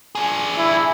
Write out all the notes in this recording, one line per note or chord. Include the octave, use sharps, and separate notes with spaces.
D4 G#4
E4